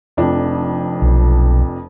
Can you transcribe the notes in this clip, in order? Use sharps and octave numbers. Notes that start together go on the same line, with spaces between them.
F1 F2 D4
B1